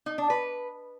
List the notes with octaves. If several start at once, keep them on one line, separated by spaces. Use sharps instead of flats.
D#4
D4
B4